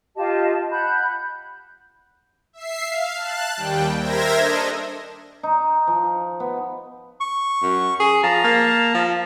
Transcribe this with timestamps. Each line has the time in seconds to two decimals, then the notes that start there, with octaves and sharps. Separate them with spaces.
0.16 F4 G4 D#5 A5
0.70 F#5 B5 F#6 G6
2.53 E5 C7
2.86 F5
3.16 A5 F#6
3.56 D#2 G3 G5
3.98 A#4 C5 E5 G#6 A#6
4.36 D4 A4 D#5
5.43 D#4
5.87 F3
6.40 B3
7.20 C#6
7.62 F#2
8.00 G#4
8.23 F3 A5 A#5
8.44 A#3
8.94 F3